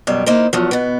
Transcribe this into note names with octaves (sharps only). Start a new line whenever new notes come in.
F#2 B2 G3
A#3 D#4 E4 C5
E2 F3 F#3
B2 B3